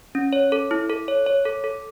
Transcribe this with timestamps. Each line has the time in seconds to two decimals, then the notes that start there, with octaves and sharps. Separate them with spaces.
0.15 C#4
0.33 C#5
0.52 A4
0.71 E4
0.90 A4
1.08 C#5
1.26 C#5
1.45 A4
1.64 A4